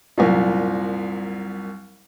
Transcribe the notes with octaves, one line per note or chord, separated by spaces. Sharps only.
C2 F#2 A#2